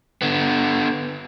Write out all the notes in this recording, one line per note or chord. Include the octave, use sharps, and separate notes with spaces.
D3 B3